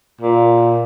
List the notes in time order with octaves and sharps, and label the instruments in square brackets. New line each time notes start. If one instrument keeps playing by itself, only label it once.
[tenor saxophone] A#2